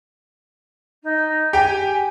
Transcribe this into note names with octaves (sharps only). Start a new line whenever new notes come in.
D#4
G4 G5 G#5